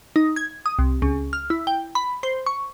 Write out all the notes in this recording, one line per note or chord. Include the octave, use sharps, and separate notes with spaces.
D#4
G#6
D#6
C2
C#2
F6
E4
G5
B5
C5
C#6